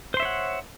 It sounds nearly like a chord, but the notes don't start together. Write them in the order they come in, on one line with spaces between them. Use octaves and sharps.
C5 C6 E5 C#5 F#5